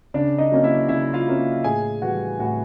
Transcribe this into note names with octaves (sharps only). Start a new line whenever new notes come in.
C#3 D4 D5
D#4 D#5
F#3 A#3 C#4 D#5
E4 E5
C#3 E4 E5
F4 F5
F#3 A#3 C#4
A2 G#4 G#5
E3 G3 F#4 F#5
A2 F#4 F#5